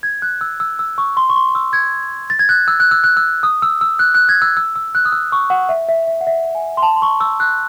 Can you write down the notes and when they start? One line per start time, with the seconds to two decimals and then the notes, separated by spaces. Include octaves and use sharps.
0.03 G#6
0.22 F#6
0.41 E6
0.60 E6
0.79 E6
0.98 C#6
1.17 C6
1.30 C#6
1.36 C6
1.55 E6
1.73 G#6
2.30 A6
2.39 G#6
2.49 F#6
2.68 E6
2.80 F#6
2.91 E6
3.04 F#6
3.17 E6
3.43 D#6
3.62 E6
3.81 E6
3.99 F#6
4.15 F#6
4.29 G#6
4.42 E6
4.57 E6
4.76 E6
4.95 F#6
5.05 D#6
5.12 E6
5.32 C#6
5.50 F#5
5.69 E5
5.89 E5
6.07 E5
6.21 F#5
6.27 E5
6.55 G#5
6.77 C6
6.82 A5
6.96 C6
7.02 C#6
7.20 E6
7.40 F#6